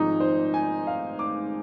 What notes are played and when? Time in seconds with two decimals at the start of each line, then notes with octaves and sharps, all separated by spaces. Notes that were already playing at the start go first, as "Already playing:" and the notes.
Already playing: G#1 G#2 F3 G#3 D#4
0.20 C5
0.54 G#5
0.87 F5
1.19 D6